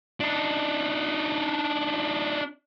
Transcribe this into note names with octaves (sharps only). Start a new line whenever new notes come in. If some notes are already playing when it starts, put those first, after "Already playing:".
D4 D#4